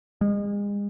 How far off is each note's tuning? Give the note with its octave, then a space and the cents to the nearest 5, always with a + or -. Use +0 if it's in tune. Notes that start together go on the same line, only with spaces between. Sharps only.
G#3 -35